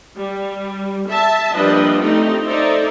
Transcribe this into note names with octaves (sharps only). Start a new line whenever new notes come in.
G3
E5 A5
F3 G3 A#3 D4 B4 D#5
A3 C4 D#4 G4
D#4 A4 C5 D5 E5